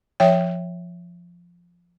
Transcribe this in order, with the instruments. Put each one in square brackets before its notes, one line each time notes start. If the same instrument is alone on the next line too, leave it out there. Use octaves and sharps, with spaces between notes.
[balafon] F3 C#5 E5 G5